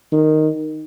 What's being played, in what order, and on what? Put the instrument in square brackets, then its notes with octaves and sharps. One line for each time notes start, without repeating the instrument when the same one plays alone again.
[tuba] D#3